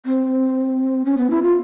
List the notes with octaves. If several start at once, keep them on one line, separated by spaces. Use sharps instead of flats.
C4
C#4
B3
E4
F4